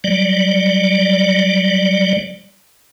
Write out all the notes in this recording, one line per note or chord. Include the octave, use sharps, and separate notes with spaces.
F#3 G3 D5